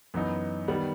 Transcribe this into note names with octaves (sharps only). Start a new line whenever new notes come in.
F#2 E3 B3 D#4
D#3 G3 B3